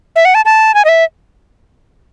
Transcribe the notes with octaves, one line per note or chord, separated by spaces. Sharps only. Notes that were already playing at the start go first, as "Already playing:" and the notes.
E5
F#5
A5
A5
G#5
D#5
E5